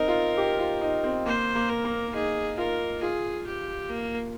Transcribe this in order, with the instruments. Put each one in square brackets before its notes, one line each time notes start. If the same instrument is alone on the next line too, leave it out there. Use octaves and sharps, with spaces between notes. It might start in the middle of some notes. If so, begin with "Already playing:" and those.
Already playing: [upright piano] C4 D#4 [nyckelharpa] A#4
[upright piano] F4
G4
F4
D#4
C4
[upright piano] A#3 [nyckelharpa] C5
[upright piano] A#3
[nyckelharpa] A#4
[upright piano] A#3
[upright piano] D#4 [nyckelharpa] G#4
[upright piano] F4 [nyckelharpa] A#4
[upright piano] F4 [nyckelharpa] G#4
[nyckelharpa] G4
A#3